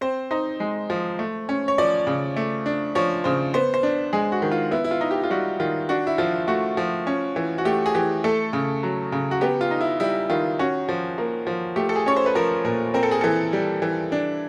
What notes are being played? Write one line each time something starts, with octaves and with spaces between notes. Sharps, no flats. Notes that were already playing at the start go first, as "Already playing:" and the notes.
C4 C5
D#4 C5
G#3
F3
A3
C#4
C#5
F3 D5
C#3
A3
D4
F3 C#5
C#3 C5
B3 C5
C5
D4
G#3 G#4
F#4
D#3
F4
B3 E4
E4
F4
D#4
G4
F4
G3 F#4
D#3 F4
D4 F#4
E4
F3 F4
A3 F#4
F3
C#4
E3
F#4
A3 G4
G#4
E3 G4
A3 A4
C#3
F#3
C#3
F#4
B3 G4
F4
D#4
E4
G3 E4
D#3 F4
C#4 F#4
F3
A#3
F3
A3 G4
A4
G#4
C#4 C#5
C5
B4
F3 A#4
A#2 A#4
C4 A#4
A4
G#4
E3 A4
G3
E3
D4